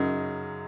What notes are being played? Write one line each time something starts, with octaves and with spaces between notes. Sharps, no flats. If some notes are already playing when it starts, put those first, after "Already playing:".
Already playing: F#2 C#3 F#3 D#4